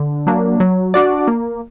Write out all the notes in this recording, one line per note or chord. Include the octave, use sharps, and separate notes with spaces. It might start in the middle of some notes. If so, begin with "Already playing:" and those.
Already playing: D3
F#3 A#3 D4
F#3
D4 F#4 D5
A#3